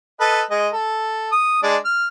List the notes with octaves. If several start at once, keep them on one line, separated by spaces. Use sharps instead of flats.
A4 B4 D#5
G#3 D#5
A4
D#6
G#3 D4 D5
F6